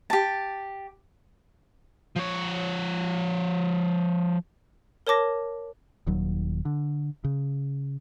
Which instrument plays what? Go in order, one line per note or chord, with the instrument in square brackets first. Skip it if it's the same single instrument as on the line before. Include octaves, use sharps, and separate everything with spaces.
[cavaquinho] G4 A5
[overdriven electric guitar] F3 C#5
[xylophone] A#4 C#5 A5 D6 A#6
[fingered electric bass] D#1 D#2 F#3
D3
C#3